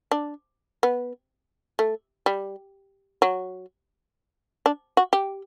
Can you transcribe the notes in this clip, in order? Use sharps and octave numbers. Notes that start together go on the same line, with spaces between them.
D4
B3
A3
G3
F#3
D4
F#4
G4